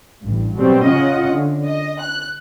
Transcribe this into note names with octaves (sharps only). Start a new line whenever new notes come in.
A1 G2
B2 F#3 G3 C4
C#3 C#4 F4 D#5 F#5
D3
D#5
F#6